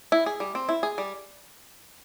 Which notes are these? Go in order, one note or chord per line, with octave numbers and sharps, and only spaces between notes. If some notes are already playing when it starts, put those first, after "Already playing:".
E4
G#4
G3
C4
E4
G#4
G3